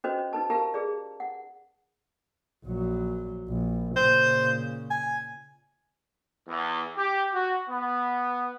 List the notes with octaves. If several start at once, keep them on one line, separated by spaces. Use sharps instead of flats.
C#4 F#4 B4 C5 D#5
D#4 B4 A5
G4 A#4 B4 F5 A5 A#5
G#4 B4 D5
F#5
A#1 F#3
A#1
A#2 C#3 C5
G#5
E2
G4
F#4
B3